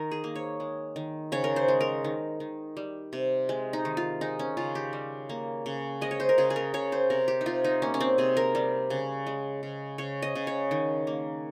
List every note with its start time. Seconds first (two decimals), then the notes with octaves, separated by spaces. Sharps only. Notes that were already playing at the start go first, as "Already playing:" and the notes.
Already playing: D#3 A#4
0.11 G#4
0.24 A#3
0.36 C#5
0.60 G#3
0.96 D#3
1.32 C#3 C#5
1.44 A#4
1.56 C5
1.68 G#3
1.81 A#4
2.04 D#3
2.40 D#3
2.77 G3
3.13 C3
3.49 G#3
3.73 D#4
3.85 D#3
3.97 F4
4.21 G#3 D#4
4.39 C#4
4.57 C#3 F4
4.75 G4
4.93 G3
5.29 A#3
5.66 C#3
6.01 G#3 D#5
6.11 C#5
6.20 C5
6.29 A#4
6.38 C#3 G#4
6.50 G#4
6.56 A#4
6.74 C#3 C#5
6.92 C5
7.10 C3 A#4
7.28 G4
7.41 D#4
7.46 C3 F4
7.64 D#4
7.82 A#3 C#4
7.94 C#4
8.00 C4
8.18 C3 G#4
8.37 A#4
8.55 G3
8.90 C#3
9.26 G#3
9.63 C#3
9.98 C#3 C#5
10.22 D#5
10.35 C#3
10.47 C#5
10.71 D#3
11.07 A#3